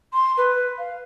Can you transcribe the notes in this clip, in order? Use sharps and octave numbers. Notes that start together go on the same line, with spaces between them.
C6
B4
F5